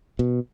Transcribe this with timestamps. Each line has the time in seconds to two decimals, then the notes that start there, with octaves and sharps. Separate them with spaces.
0.19 B2